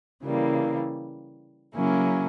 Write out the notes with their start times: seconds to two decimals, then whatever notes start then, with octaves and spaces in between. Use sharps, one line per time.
0.23 C#3 E3 G3 A#3
1.75 C#3 F#3 A#3 C#4 E4